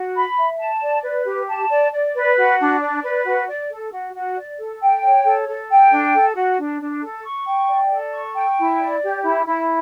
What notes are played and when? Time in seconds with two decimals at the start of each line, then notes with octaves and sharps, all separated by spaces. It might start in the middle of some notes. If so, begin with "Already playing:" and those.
Already playing: F#4
0.15 B5
0.37 E5
0.59 A5
0.82 D5
1.03 B4
1.25 G4
1.48 A5
1.70 D5
1.92 D5
2.14 B4
2.36 F#4
2.59 D4
2.81 D5
3.02 B4
3.25 F#4
3.48 D5
3.70 A4
3.91 F#4
4.14 F#4
4.36 D5
4.59 A4
4.81 G5
5.03 C#5
5.24 A4
5.48 A4
5.70 G5
5.91 D4
6.14 A4
6.35 F#4
6.58 D4
6.80 D4
7.03 A4
7.24 C#6
7.46 G5
7.68 D5
7.91 A4
8.13 C#6
8.35 G5
8.58 E4
8.80 D5
9.02 G4
9.23 E4
9.46 E4